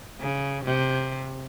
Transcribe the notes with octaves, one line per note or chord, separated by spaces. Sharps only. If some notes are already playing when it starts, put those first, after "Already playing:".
C#3
C3